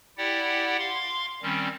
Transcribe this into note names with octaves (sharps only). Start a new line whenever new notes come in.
E4 G4 D5 F#5 G5
F5 C6
D#3 G3 C4 C#4